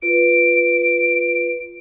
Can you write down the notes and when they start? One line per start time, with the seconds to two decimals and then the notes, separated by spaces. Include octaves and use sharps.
0.02 F4 B4 D7